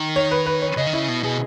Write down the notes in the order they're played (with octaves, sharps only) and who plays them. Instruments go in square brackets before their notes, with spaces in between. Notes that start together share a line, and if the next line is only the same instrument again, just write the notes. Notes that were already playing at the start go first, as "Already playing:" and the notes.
Already playing: [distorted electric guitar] D#3
[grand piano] C#5
B4
B4
C#5
[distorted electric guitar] C#3 [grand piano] D#5
[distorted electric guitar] D#3
[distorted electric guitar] C#3 [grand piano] E4
[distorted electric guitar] B2
[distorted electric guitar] B2 [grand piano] G#4